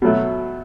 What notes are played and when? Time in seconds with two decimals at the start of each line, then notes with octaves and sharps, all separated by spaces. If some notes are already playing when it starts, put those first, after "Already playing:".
0.02 B2 F#3 A3